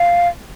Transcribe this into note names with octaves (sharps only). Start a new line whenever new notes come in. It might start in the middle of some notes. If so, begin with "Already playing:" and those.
Already playing: F5